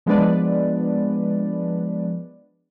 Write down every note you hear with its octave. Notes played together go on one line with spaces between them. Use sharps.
F3 G#3 B3 D4 B4 D5